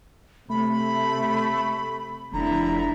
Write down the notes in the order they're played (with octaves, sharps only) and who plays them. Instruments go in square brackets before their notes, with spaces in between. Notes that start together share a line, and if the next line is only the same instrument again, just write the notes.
[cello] C3 [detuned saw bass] A3 [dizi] B5
[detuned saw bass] F1 [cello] D3 E4 [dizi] A#5